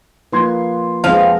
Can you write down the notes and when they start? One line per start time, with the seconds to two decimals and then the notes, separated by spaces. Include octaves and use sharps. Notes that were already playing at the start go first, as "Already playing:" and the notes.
0.33 F3 A#3 B4 C6 G#6
1.04 F2 F3 G#3 B3 C4 D#5 F5